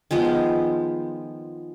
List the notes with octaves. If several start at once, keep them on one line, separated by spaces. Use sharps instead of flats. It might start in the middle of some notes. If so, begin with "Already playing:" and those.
D#3 F3 G#3 B3